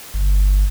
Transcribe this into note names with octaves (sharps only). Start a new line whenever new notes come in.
G1